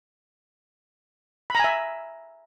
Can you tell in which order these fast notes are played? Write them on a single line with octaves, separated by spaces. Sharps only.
B5 A#5 G#5 E5